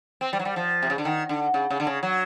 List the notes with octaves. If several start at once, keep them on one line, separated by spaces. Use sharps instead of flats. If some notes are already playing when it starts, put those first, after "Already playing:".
C4
G3
F#3
G3
F3
C3
C#3
D3
D#3
D3
C#3
C#3
D3
C#3
F#3